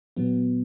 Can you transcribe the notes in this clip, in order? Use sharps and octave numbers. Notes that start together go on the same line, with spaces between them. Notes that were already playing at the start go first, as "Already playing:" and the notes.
A#2 F#3 B3